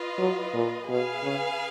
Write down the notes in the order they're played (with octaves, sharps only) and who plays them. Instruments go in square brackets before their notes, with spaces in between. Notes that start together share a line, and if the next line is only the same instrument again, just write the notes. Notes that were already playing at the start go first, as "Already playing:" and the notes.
Already playing: [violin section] F4 B4 D#5
[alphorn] F#3
A#2
[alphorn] B2 [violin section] G#4 B4 F5 G#5
[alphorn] C#3